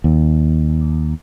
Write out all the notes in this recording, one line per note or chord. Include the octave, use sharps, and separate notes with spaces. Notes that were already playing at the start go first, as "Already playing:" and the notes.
D#2